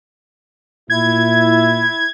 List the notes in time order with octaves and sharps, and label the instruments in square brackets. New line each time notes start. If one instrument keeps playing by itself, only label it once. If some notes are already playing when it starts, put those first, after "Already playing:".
[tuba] A#2 [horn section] E4 [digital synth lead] G#6